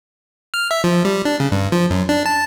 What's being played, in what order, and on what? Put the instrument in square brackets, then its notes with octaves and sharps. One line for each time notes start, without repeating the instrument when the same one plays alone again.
[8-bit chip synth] F6
E5
F3
G3
D4
C#3
G2
F3
F#2
D4
A5